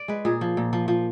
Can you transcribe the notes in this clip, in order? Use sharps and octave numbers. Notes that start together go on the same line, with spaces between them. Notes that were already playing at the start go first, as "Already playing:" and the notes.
Already playing: D5
G#3 B4
A#2 G#4
F3
A#2
F3
F3